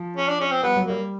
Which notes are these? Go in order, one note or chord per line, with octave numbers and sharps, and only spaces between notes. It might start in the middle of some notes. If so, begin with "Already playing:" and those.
Already playing: F3
C#4
D4
C#4
C4
G3 B3
F#3
G3 A#3